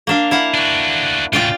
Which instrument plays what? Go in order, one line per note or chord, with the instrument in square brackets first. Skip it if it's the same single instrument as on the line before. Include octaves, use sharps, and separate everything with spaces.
[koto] A#3 D4 F5
E4 F5 F#5
[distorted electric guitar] D4 F#4
[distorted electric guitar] A2 C#3 [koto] F4 D5 G5